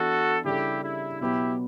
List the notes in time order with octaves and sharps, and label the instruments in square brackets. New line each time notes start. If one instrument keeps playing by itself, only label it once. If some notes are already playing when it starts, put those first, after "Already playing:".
Already playing: [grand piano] E3 B3 D4 [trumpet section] F#4 A4
[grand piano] C#3 G3 D4 A4 [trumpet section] E4 G4
[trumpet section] E4
[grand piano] B2 F#3 B3 [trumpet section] E4 G4